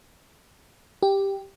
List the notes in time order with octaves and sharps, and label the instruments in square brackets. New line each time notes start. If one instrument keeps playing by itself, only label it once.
[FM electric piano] G4